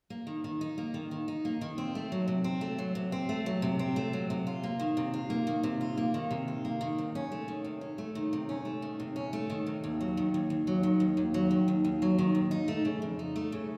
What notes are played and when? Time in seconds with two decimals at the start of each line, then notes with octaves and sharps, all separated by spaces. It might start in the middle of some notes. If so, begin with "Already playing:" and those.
0.10 A#3
0.27 D#3
0.44 D#3
0.61 D#4
0.78 A#3
0.94 D#3
1.11 D#3
1.28 D#4
1.45 A#3
1.61 D#3
1.78 C4
1.95 A3
2.12 F#3
2.28 C3
2.44 C4
2.61 A3
2.79 F#3
2.95 C3
3.12 C4
3.29 A3
3.46 F#3
3.62 C3
3.79 C4
3.96 A3
4.13 F#3
4.30 C3
4.47 F4
4.63 A#3
4.80 D#3
4.97 C3
5.14 F4
5.30 A#3
5.47 D#3
5.63 C3
5.81 F4
5.97 A#3
6.14 D#3
6.31 C3
6.48 F4
6.65 A#3
6.81 D#3
6.98 C3
7.15 C#4
7.32 A3
7.48 D#3
7.64 C3
7.81 C#4
7.98 A3
8.15 D#3
8.33 C3
8.49 C#4
8.65 A3
8.82 D#3
9.00 C3
9.16 C#4
9.33 A3
9.50 D#3
9.67 C3
9.84 D#2
10.01 F#3
10.17 D#3
10.34 D#2
10.50 D#2
10.67 F#3
10.83 D#3
11.00 D#2
11.17 D#2
11.34 F#3
11.51 D#3
11.68 D#2
11.85 D#2
12.02 F#3
12.18 D#3
12.35 D#2
12.51 D#4
12.68 A3
12.85 C#3
13.02 F2
13.19 D#4
13.36 A3
13.52 C#3